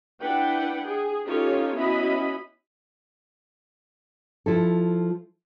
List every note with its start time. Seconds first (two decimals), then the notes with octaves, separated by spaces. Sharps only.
0.22 D4 E4 B4 F#5 G5
0.85 G#4
1.27 C#4 D#4 F4 G4 A4 C#5
1.75 B3 C#4 E4 F#4 D#5 B5
4.46 F3 E4 A4